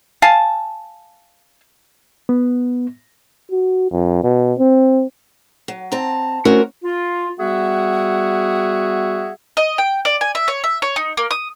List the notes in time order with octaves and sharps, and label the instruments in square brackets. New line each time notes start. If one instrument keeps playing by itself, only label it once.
[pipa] F5 G#5 A5
[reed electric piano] B3
[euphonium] F#4
F2
B2
C4
[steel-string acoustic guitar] F#3
C4 A5 A#5
A3 C4 C#4 E4 F#4 A#4
[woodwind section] F4
G3 B3 F#4 G#4 E5 F#5
[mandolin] D#5
G5
D5
G#5
E5
C#5
E5
C#5
D#4
A#3
D#6